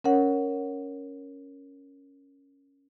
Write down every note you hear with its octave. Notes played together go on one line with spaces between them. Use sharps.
C#4 A#4 C#5 F#5